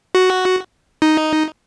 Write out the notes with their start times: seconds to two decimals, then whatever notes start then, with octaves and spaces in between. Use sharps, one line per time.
0.15 F#4
1.02 D#4